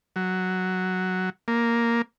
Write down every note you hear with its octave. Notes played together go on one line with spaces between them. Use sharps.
F#3
A#3